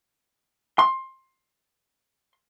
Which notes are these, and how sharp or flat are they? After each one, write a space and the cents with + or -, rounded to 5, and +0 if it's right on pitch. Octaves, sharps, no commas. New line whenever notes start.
C6 +20